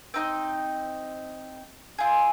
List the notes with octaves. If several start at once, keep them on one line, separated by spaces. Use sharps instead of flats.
C4 D#4 A#4 D#5
C4 F4 G#4